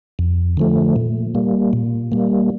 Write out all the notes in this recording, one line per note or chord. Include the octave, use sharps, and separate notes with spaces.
F2
D3 F3 A3
A#2
G3 A#3
A#2
G3 A#3